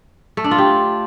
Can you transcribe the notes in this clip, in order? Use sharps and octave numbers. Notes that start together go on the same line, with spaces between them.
A3
D4
F4
G4